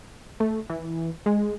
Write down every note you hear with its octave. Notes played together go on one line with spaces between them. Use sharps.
A3
E3
G#3